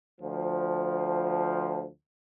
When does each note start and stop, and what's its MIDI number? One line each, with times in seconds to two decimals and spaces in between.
0.21 1.86 38
0.21 1.86 53